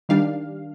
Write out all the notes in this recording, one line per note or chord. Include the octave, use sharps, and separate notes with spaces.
D#3 G3 D4 F5